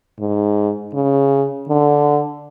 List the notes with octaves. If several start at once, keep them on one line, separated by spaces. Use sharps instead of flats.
G#2
C#3
D3